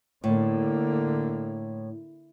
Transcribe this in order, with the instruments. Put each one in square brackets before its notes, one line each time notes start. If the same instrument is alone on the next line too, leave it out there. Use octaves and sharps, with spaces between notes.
[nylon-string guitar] A2 [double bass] D3 A#3